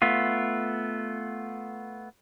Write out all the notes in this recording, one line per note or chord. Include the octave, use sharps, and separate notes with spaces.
A3 B3 F4